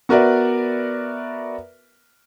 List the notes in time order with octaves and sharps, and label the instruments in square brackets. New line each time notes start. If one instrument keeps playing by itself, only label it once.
[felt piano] B3 F#4 A#4 B4 D5 E5